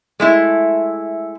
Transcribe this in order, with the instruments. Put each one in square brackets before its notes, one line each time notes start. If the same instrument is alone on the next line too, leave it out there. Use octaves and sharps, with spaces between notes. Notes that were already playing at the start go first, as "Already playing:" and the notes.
[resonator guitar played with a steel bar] G#3 A3 E4